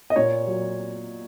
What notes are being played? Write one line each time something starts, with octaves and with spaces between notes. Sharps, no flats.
D#5
A#2 C#5
F#3